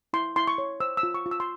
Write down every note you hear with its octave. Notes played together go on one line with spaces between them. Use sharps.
E4 C6
E4 C6
C#6
C#5
C5 E6
E6
F4
C#6
F4
E6
C6